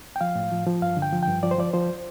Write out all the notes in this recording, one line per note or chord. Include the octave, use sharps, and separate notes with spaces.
G5
F3 F5
A2
F3
F3
G2 F5
D3
G5
F3
G2 G5
F3 D5
C5
F3 D5
F3 C5